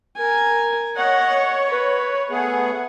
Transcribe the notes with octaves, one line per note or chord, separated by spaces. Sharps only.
A#4 G#5
C#5 D#5 F#5
B4
A3 B3 G#4 F#5